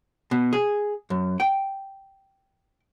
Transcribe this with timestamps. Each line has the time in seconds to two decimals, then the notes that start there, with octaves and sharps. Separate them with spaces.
0.31 B2
0.53 G#4
1.10 F#2
1.40 G5